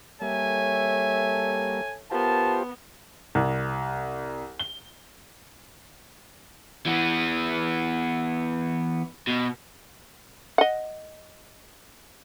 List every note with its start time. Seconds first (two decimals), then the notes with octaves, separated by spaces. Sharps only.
0.21 G3 A#3 A4 C#5 E5 G#5
2.11 B3 F4 G4 A#4 C5 A5
3.35 C2
4.60 G7
6.86 E3 B3
9.27 B2
10.58 D#5 F#5